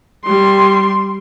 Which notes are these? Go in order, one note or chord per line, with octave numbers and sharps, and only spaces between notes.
G3 C6